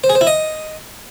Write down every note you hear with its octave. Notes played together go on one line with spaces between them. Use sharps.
C5
G#4
C5
E4
D#5